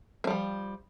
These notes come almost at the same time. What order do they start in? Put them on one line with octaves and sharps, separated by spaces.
A#3 G3 F3